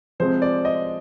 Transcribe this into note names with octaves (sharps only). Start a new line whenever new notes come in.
C3 F3 G#3 C4 C5
D5
D#5